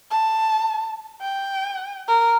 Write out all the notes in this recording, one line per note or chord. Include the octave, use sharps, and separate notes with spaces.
A5
G5
A#4